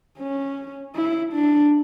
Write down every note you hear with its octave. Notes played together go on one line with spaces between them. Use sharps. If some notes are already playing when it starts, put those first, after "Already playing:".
C#4
E4
D4